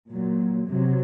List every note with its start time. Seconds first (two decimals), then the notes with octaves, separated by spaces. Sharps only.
0.11 A#2 F#3
0.69 C3 F#3